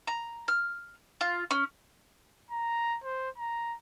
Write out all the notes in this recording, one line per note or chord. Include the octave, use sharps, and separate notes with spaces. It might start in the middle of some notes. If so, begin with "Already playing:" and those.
A#5
F6
F4
C#4
A#5
C5
A#5